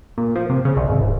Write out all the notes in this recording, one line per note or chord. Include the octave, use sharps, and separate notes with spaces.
A#2
F3
C3
C#3
C2
G#1
D1